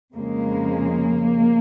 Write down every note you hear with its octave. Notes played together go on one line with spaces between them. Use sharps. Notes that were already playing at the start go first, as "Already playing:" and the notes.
F2 C#3 F3 G#3 A#3